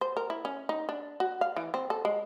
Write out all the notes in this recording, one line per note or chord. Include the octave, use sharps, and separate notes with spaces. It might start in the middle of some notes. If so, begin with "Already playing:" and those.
C5
A#4
E4
C#4
D#4
D4
F#4
F5
E3
C4
A4
G#3